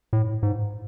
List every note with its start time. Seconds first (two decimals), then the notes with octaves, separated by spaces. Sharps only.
0.13 A2
0.43 G#2